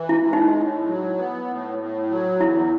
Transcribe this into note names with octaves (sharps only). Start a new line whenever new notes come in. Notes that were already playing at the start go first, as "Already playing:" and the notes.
Already playing: E3
E4
G#3
D#4
A2
F#3
B3
A2
A2
F#3
E2 E4